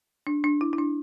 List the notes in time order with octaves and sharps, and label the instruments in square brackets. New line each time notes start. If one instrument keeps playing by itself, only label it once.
[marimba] D4
D4
E4
E4
D4